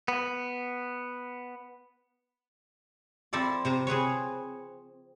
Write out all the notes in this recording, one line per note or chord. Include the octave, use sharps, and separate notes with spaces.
B3
F3 C4 E4 A4 D5
C3 C5 A#5
C4 G#4 B4 C#5